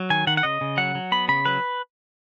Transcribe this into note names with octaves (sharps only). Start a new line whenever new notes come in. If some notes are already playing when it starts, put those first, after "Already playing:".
Already playing: F#3
D#3 G#5
D#3 F#5
F#5
C#3 D#5
C#3
F#3 F#5
F#3
B3 B5
C#3 B5
F#3 B4